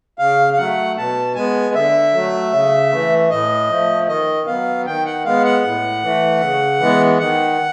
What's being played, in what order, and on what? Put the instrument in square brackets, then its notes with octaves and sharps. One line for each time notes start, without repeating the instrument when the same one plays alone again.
[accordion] C#3 F5
F5
F#3 A3 F#5
B2 A5
G#3 B3 G#5
D3 E5
F#3 A3
C#3
E3 A3
A2 D#5
F3 A3
D#3 D#5
F#3 B3 F5
D#3 G5
F#5
G#3 B3 F5
F#5
A2
E3 A3
C#3
E3 G#3 B3
D#3 F#5